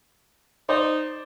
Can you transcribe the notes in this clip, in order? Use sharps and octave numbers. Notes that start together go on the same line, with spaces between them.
D#4 C5 D5